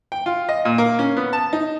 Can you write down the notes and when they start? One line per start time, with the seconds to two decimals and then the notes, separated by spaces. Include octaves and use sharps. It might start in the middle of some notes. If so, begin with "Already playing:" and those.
0.12 G5
0.26 F4
0.49 D#5
0.65 A#2
0.78 A#3
0.99 C#4
1.17 B3
1.33 A5
1.53 D#4